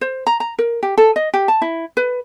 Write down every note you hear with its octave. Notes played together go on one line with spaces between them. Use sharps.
C5
A#5
A#5
A#4
G4
A4
D#5
G4
A5
E4
B4